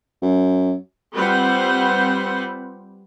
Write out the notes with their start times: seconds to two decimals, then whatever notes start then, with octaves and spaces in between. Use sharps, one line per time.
0.22 F#2
1.13 G3 C4 F4 B4 C5 F#5